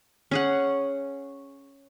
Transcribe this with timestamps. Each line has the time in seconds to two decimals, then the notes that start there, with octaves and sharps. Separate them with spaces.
0.31 C#4 G#4 F#5